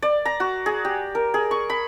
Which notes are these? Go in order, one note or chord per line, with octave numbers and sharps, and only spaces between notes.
D5
A#5
F#4
G#4
G4
A#4
G#4
C#6
B5